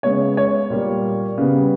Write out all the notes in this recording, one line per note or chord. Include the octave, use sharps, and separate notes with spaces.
C#3 G#3 B3 C#5
C#5
A#2 G3 A#3
C#3 G3 B3